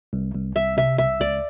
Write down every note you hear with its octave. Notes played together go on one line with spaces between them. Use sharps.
C2
C2
C2 E5
C3 E5
C2 E5
C#2 D5